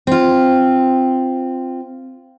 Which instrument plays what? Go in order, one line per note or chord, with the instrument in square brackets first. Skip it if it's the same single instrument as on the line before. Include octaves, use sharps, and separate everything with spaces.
[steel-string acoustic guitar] C4 F4